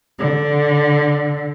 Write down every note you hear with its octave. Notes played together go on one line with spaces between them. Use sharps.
D3